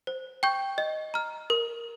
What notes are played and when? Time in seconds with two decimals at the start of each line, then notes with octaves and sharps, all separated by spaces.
0.07 C5
0.43 G5 C#6 G6
0.78 D#5
1.14 A#5 F6
1.50 A#4